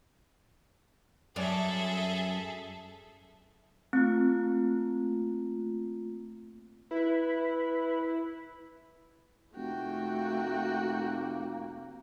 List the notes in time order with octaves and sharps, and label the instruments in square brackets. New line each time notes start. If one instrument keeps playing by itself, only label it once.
[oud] F#2 C#5 D5 [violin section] G#4 A4 E5
[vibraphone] A3 A#3 F4 [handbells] C4
[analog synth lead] E4 [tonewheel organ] B4
[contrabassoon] F1 [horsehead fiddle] A3 [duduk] A#3 [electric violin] F#4 G5